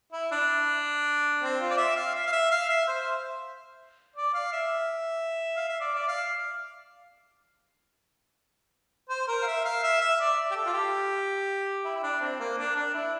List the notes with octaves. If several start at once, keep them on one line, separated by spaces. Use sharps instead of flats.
E4
D4
C4
F4
D5
E5
F5
E5
F5
E5
F5
E5
C5
D5
F5
E5
F5
E5
D5
D5
F5
C5
A#4
F5
E5
F5
E5
E5
D5
G4
A4
F4
G4
E4
E4
D4
C4
A#3
D4
D4
E4